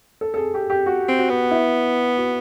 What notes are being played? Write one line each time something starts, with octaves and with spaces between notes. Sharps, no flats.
A4
A4
G#4
G4
G4
F#4
C4
F#4
B3
E4
F#4